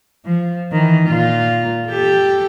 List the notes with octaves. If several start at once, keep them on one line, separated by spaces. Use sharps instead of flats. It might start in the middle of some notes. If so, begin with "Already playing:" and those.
F3
D#3 E3
A#2 F4
G4 A4